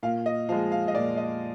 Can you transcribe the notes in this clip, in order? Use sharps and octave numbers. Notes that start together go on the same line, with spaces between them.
A#2 F5
D#5
F3 G#3 F5
F5
D#5
A#2 D5
D#5